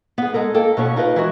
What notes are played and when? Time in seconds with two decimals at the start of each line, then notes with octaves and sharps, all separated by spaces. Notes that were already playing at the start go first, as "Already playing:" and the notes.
0.18 B3 G#4
0.34 G#3 A4 A#4
0.54 A#3 A4 G5
0.77 B2 A#3 B3 C#4 C#5
0.96 D#4 F4 A#4 B4 D#5
1.16 E3 G#3 F#4